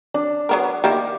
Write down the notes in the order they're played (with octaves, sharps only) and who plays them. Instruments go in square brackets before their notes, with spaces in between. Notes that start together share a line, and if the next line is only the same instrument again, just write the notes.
[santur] D4
[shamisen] F#3 B3 A#4
[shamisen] D#3 A#3 E4 [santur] G4